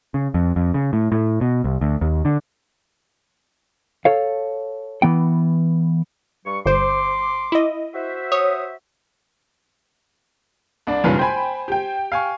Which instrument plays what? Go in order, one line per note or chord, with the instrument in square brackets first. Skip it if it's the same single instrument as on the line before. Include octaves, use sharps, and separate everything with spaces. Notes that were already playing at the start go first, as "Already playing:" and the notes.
[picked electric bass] C#3
F2
F2
C#3
A2
A2
B2
C2
D2
D#2
D3
[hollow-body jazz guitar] A4 C#5 F5
E3 B3 G5
[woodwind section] G2 G3 C#6
[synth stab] G1 C5 [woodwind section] C6 D6
[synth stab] E4 D#5
[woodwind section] F#4 C5 E5
[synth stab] C#5 D#6
[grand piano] C2 D4 D5
[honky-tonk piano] F#1 B1 G2 [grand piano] C#4 F4 B4
[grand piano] C5 G#5 [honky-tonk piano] G5 B5
[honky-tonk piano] G4 G5
[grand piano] F5 G#5 C#6